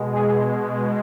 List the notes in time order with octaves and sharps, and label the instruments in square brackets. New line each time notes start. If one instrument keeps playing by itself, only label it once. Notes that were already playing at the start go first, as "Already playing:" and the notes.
Already playing: [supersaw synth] B2 G#3
G#4